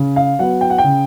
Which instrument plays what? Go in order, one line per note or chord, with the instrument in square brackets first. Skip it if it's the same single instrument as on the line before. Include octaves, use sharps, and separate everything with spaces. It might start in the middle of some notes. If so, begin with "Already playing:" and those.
Already playing: [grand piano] C#3
F5
F#3 B3 F#5
G5
F#5
G5
C#3